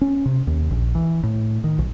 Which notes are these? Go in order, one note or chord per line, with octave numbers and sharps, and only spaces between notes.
C#4
C3
D#2
A#1
E3
A2
D#3
B1